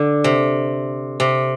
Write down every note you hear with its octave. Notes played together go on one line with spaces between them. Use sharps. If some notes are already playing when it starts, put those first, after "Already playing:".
Already playing: D3
C3
C3